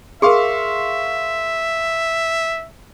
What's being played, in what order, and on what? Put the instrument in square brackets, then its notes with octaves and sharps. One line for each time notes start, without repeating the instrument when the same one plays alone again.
[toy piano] G#4 A#4 [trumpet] E5 [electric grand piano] F5 C6 C#6